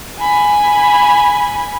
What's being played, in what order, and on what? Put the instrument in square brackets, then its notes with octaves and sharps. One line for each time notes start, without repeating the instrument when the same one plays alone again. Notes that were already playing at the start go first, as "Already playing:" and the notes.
[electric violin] G#5 B5